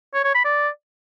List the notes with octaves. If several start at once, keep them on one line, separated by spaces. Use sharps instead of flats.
C#5
C#5
B5
D5